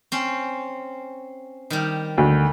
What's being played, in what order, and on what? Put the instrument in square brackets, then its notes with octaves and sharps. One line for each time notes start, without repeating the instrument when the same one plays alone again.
[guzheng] C4 C#4
D#3 G3
[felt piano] D2